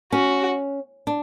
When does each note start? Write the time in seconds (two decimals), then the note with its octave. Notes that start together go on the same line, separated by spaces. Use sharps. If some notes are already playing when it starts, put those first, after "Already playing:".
0.12 C#4 F#4
1.07 D4